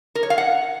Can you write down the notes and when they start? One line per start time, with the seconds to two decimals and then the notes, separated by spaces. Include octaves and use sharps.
0.15 A#4
0.23 C#5
0.30 F5
0.38 F#5